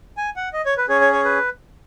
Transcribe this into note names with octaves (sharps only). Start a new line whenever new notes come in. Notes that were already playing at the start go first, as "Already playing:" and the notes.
G#5
F#5
D#5
C#5
B4
C#4 G#4 C#5
C#5
C#5
B4